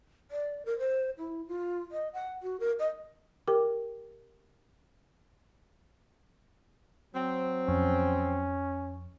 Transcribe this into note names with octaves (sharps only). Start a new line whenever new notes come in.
D5
A#4
C5
E4
F4
D#5
F#5
F#4
A#4
D#5
G4 A#4 G5 D6
F#3 C4
F2 C#4